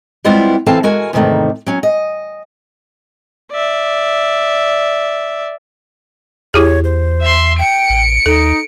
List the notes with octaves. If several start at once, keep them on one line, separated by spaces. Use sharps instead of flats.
G3 G#3 B3 C4 E4 F4
E3 C4 A4 F5 G#5 A5
G#3 F#4 A#4 G#5
E2 G#2 C3 D#3 A3
F#3 C#4
D#5
D5 E5
E2 E4 G4 G#4 C#5
C5
E5 C6
G5 C#7 D7
A1
D#2 D#4 A4